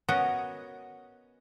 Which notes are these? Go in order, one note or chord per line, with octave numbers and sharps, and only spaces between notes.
B3 C#4 F#4 A#4 D#5